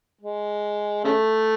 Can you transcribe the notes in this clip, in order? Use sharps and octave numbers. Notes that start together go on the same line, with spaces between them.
G#3
C#3 A3